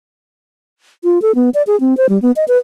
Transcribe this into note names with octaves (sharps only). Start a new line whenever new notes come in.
F4
A4
B3
D5
G#4
C4
C5
G3
B3
D#5
B4